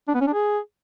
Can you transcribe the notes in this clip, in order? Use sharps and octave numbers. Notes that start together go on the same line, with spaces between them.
D4
B3
C#4
D4
G#4